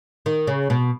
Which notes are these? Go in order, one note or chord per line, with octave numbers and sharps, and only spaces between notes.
D#3
C#3
B2